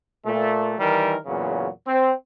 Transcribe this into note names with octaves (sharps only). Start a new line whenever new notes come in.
A#2 A3
D#3 E3 G3 A#4
E2 A#2 C#3 F#3
C4